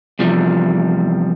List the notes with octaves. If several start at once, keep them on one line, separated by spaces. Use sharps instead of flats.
E2 C3 F3 G3